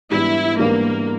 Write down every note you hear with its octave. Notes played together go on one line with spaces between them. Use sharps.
G#2 E3 G3 B3 D4 E4
G#2 E3 G3 A#3 B3 D4